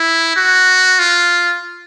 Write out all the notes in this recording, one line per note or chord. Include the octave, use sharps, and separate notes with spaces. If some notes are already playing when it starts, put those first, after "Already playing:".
Already playing: E4
F#4
F4